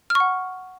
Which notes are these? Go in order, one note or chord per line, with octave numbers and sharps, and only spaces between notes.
F6
C#6
F#5